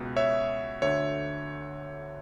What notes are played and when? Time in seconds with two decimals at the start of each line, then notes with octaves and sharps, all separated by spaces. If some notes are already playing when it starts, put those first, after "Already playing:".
Already playing: C#2 B2
0.16 C#5 E5
0.82 D2 D3 C#5 E5